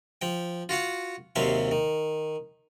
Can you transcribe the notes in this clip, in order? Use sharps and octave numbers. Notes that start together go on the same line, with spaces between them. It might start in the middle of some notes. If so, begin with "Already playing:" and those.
F3 G5
F4 F#4 F5 F#5
D#2 C3 F#3 E5 F5 C6
D#3